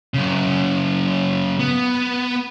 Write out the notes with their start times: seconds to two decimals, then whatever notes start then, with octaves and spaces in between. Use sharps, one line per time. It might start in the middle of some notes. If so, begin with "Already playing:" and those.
0.14 F#2 C#3
1.60 B3